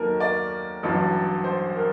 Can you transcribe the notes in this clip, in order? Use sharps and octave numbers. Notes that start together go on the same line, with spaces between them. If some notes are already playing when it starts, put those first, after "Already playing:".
Already playing: D#2 D#3 F#3 A4 A#4
D5
A1 G2 F#3
C5
A#4